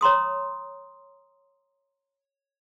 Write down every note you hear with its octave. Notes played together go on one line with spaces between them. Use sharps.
C#5 A#5 C6 D#6